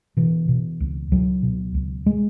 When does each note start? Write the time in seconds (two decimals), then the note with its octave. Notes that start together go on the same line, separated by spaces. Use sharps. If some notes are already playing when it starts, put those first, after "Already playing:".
0.17 B2 E3
0.48 B2
0.80 C#2
1.12 C#2 F#3
1.43 B2
1.75 C#2
2.06 G#3